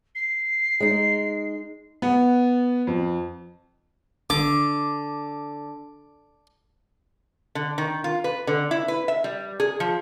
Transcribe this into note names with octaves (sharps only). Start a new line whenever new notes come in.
C7
G#3 D#4
B3
F2
D3 D6
D3
D#3
F4
B4
D3
E4
B4
E5
G3
G#4
F3